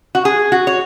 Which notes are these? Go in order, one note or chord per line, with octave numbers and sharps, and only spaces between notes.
F#4
G#4
F#4
C#5